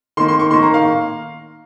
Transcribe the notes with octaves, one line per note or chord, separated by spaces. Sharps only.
D#3 A#3 C6
C6
C#6
D#3 A#3 C6
A#5
F5